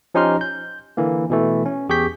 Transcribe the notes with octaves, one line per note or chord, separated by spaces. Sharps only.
F3 C#4 D#4 G4 C6 F6
G6
D3 E3 A#3
B2 E3 A3
C#4
E2 G4 G#4 C#6 G6 B6